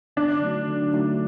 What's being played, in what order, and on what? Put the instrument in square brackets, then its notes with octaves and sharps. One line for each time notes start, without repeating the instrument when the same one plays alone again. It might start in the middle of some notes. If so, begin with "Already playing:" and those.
[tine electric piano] D3 [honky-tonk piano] D4
[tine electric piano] F#3 A3 D#4 F#4
D3
F#3 A3 D#4 F#4